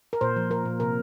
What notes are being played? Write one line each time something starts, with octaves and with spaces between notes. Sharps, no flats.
A#4
A#2 C5
F3
A#3 A#4
A#2
C3 A#4